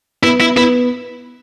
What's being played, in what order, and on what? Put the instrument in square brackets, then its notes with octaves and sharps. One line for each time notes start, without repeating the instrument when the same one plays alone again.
[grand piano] B3 [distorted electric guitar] E4
[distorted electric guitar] E4
[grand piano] B3 [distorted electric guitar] E4